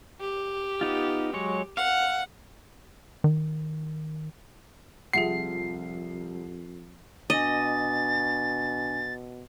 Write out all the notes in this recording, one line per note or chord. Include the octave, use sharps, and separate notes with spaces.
G4
B3 D#4 F4
F#3 G#3 C#5
F5 F#5
D#3
C2 F2 F3 G#4 E5 F#5 C7
B2 D4 D#5 G#5 A6